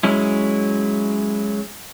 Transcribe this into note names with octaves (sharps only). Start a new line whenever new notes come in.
F#3 G#3 C#4 E4